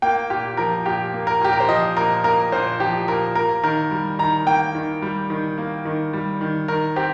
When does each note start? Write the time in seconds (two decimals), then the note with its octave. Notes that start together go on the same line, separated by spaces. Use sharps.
0.02 A#3 G5
0.30 A#2 G4
0.57 F3 A#4
0.85 A#2 G4
1.13 A#3
1.27 A#4
1.41 A#2 G4
1.53 A#4
1.60 C5
1.69 F3 D#5
1.97 A#2 A#4
2.24 A#3 A#4
2.52 A#2 C5
2.80 F3 G4
3.08 A#2 A#4
3.35 A#3 A#4
3.63 D#3 A#4
3.91 G3
4.19 D#3 A#5
4.46 A#3 G5
4.75 D#3
5.02 G3
5.30 D#3
5.58 A#3
5.85 D#3
6.13 G3
6.41 D#3
6.68 D#3 A#4
6.96 C4 G4